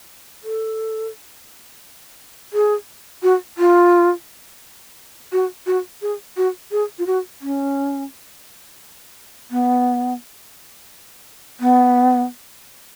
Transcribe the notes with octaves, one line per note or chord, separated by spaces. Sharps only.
A4
G#4
F#4
F4
F#4
F#4
G#4
F#4
G#4
F4
F#4
C#4
B3
B3